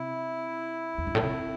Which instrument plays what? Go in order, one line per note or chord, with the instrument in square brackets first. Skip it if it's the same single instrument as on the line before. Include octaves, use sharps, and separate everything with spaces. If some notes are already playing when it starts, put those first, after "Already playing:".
Already playing: [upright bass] C3 [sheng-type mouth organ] E4
[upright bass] E2
G2
A2
C3